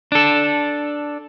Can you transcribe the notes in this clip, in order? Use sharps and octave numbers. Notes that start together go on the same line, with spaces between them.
D4 A4